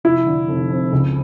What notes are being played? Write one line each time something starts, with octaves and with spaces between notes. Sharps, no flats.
F1 E4
D3
F1
F2
C#2